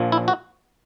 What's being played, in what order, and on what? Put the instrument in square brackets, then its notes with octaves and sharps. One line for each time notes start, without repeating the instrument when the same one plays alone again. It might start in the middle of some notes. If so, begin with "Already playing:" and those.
Already playing: [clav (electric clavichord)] A#1 A#2 F3
E4
F#4